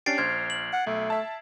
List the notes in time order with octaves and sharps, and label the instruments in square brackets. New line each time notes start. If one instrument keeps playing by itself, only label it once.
[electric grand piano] C#4 D4 G4 [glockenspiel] A6 C7 D7
[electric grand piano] A#1 C5 F6 [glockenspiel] G#6
[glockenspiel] F#7
[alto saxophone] F#5
[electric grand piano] B1 [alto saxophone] A3
[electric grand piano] E5 A5